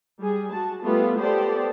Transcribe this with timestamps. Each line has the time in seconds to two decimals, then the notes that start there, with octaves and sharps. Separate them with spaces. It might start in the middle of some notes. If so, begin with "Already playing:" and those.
0.21 G3 G#4
0.51 F#4 A5
0.83 G3 A3 B3 F4
1.20 B3 G4 A4 C5 D5